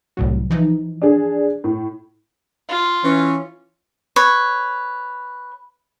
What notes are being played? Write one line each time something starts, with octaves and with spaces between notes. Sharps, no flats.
C2 A2 F#3
E3 F3 D#4
D4 G#4
A2
F4
E3 C#4
B4 C#5